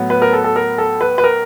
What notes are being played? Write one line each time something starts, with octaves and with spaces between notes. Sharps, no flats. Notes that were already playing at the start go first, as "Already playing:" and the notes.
Already playing: A2 F#3 B3
B4
A#4
A4
A4
A#4
A4
B4
B4
A#4